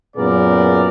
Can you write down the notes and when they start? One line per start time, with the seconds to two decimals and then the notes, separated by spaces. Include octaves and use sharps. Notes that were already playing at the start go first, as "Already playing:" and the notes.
0.17 F#2 A#2 B3 G#4 A#4 D5